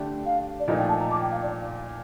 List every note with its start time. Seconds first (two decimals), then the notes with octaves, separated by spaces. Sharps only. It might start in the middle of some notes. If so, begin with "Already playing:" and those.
Already playing: D3 A3 D4 G4
0.26 F5
0.59 D5
0.68 A#2 F3 A3 D#4 D#5
0.78 G5
0.88 A5
1.00 A#5
1.11 D6
1.22 G5
1.31 F5
1.42 D5